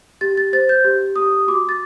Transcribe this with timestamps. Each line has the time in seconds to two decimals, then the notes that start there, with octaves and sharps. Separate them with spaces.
0.21 G4 A6
0.37 A6
0.53 C5 A6
0.69 G6
0.85 G4
1.16 G4 D#6
1.48 F#4 D6
1.69 A6